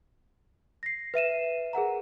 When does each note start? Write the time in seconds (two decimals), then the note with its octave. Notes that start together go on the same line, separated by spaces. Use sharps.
0.83 A#6 C7
1.14 B4 E5 D#7 E7
1.73 G#4 A#4 F#5 A#5